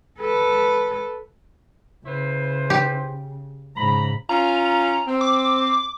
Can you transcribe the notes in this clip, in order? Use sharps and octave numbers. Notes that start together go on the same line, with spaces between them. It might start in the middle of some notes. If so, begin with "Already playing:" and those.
A4 B4
C#3 E4 B4 C5
G4
G#2 C#3 A#5 B5
C#4 F4 A#5
C4
D6